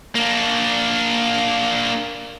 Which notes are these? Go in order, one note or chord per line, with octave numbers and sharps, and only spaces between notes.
A#3 D4